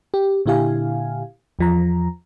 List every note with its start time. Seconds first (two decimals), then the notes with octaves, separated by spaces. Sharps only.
0.14 G4
0.46 A#2 D3 E4 G4 F5 G#5
1.59 E2 F3 A#5